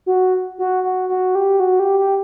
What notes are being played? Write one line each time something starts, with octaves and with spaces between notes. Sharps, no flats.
F#4
F#4
F#4
F#4
G4
F#4
G4
G4